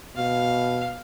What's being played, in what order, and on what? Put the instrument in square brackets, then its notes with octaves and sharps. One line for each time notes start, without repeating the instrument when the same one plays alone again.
[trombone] B2 [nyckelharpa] F5